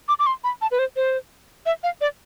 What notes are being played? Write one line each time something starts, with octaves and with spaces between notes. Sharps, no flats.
D6
D6
C6
B5
A5
B4
C5
C5
E5
F5
D5